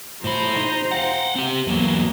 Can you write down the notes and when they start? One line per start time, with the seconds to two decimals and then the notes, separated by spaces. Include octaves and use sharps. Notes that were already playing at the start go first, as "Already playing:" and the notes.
0.24 A2 C5 A#5 B5
0.58 D#4
0.91 F5 F#5
1.36 C4 G4
1.67 E2 F#3 A#3 B3